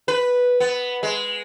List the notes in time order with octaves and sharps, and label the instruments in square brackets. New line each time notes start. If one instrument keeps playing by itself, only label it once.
[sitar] B4
B3
G#3